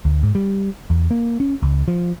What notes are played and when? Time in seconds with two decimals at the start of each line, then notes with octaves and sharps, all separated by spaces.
0.05 D2
0.23 G#2
0.35 G3
0.90 E2
1.11 A#3
1.40 C#4
1.63 C#2
1.88 F3